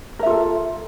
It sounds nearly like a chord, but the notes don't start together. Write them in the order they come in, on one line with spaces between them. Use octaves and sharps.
A#4 E5 F4 A4